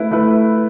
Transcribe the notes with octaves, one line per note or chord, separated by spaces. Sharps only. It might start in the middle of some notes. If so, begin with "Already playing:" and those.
Already playing: A3 E4 B4
A3 E4 B4